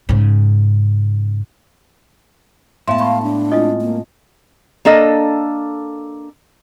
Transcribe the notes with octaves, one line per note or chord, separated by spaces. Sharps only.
G#2 C#3
A2 G#3 B3 E5 F5 A5 C6
F5 B5 C#6
D4
G#3 C4 E4 F4 D#5 D#6
A#3
A#3 D4 A4 D#5